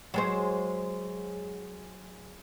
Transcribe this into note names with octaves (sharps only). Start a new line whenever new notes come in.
F#3 G#3 C5